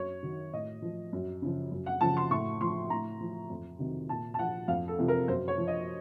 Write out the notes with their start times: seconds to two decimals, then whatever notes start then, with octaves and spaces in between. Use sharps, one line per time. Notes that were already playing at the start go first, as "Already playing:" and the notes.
Already playing: F#2 C#5
0.23 D#3 F#3
0.53 A2 D#5
0.82 F3
1.13 F#2
1.42 C#3 F3
1.71 F#2
1.86 F#5
2.01 C#3 F3 A5
2.17 C6
2.31 A2 C#6
2.61 F3 C6
2.90 A2 A#5
3.21 F3
3.50 F2
3.79 C3 D#3 F#3
4.09 A#2 A5
4.34 A5
4.39 F3 F#5
4.68 F2 F5
4.88 A4
4.99 C3 F3
5.08 A#4
5.28 F#2 C5
5.48 C#5
5.58 F3
5.67 D#5